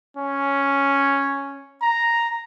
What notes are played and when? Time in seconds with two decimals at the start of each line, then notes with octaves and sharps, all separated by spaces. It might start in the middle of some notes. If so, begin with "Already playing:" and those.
0.17 C#4
1.82 A#5